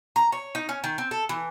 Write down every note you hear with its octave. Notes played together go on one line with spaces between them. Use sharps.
A#5
C#5
D#4
C#4
D#3
C4
A4
E3